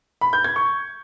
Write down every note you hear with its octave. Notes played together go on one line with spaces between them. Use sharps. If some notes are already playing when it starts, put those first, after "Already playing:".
B5
G6
G#6
C#6